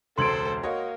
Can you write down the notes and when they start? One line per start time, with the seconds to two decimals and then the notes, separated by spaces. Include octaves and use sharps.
0.18 E1 C#2 A4 C5 C6 G#6 D7 F#7
0.63 A#3 F#4 C#5 D#5